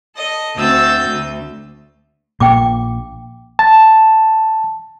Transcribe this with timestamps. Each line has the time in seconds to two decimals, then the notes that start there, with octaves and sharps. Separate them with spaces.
0.15 A4 D#5
0.56 D2 C4 F#4 E6 G6 A6
1.08 D2
2.40 A#1 A#2 A#3 G5 D6
3.59 A5